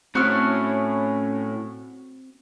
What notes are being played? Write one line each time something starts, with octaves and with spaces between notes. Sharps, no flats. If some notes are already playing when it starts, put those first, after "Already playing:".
A2 C4 C#4 F#4 F6